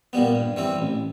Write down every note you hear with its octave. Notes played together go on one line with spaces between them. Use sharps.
A#2 G3 B3
G2
E3 G3 C4
A1